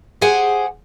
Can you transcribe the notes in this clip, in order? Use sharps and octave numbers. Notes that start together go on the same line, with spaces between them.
G4 G#4 C5 F#5 G#5